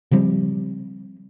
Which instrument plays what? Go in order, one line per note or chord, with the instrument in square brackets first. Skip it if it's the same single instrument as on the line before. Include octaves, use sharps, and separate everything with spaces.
[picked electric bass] C#3 F3 G3 C4